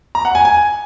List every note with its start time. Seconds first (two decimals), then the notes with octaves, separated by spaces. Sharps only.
0.15 A#5
0.25 F#5
0.35 G#5
0.45 G#5